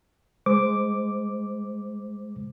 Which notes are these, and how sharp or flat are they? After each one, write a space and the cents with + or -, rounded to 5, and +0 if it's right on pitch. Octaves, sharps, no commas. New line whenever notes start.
G#3 +0 C5 +0 D6 +0